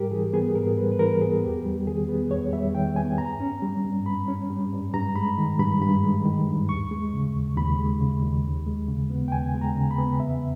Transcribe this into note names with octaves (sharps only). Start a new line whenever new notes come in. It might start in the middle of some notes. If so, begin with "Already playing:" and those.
Already playing: G#2 G3 G4 A#4
E3 G#4
B3 G#4
G#2 A#4
G3 B4
B4
E3 A#4
B3 G#4
E2 G4
G3
D#3 G#4
B3
E2 C#5
G3 E5
D#3 G5
B3 G#5
G2 A#5
C#4
G3
G2
G2 B5
C#4
G3
G2
G2 A#5
G#3 B5
D#3
G2 B5
G2 B5
G#3
D#3
G2
D#2 C#6
G#3
C#3
D#2
D#2 B5
G#3
C#3
D#2
D#2
G#3
C#3
B3
G5
D#2 G#5
G#3
A#5
C#3
B5
B3
E2 E5